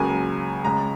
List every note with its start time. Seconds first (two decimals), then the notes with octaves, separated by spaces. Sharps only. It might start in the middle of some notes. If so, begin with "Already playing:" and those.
Already playing: C#2 C#3 F#3 A#3 G#5
0.64 C#2 C#3 G#3 A#5